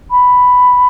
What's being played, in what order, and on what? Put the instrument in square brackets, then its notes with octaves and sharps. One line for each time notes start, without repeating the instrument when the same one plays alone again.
[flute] B5